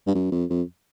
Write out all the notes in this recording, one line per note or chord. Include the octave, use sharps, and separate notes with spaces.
G2
F#2
F2
F2